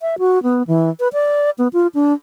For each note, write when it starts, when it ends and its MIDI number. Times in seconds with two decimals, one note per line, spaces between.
0.02 0.15 76
0.19 0.42 66
0.43 0.63 59
0.67 0.90 52
1.00 1.08 71
1.13 1.50 74
1.58 1.68 59
1.73 1.87 65
1.95 2.13 62